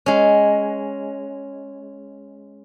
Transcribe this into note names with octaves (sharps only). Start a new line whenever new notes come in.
G#3 C#4